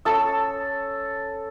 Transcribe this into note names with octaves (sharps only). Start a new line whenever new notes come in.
C#4 A4 E6